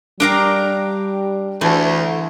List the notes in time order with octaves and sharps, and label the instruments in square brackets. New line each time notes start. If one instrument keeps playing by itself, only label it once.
[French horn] G3 [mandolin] D4 G4 A#5 [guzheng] A#4 F5
[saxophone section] D2 [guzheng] E3 [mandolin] A3